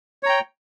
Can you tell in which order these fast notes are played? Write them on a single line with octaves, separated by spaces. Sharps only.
C#5 A#5 G5